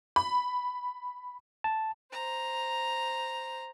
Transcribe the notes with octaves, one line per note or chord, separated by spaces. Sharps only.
B5
A5
C5 A#5